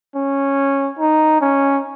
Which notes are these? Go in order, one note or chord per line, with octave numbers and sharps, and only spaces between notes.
C#4
D#4
C#4